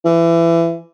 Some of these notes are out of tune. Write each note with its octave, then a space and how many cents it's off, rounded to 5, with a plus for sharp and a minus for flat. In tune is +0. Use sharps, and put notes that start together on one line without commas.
E3 +25